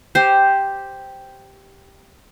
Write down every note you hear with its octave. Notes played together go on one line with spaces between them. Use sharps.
G4 C5